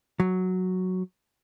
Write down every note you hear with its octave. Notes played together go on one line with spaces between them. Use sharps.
F#3